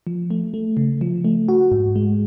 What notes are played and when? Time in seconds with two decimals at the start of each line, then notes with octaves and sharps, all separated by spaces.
0.07 F3
0.30 A3
0.54 A3
0.77 C#3
1.01 F3
1.25 A3
1.49 F#4
1.72 G#2
1.96 G#3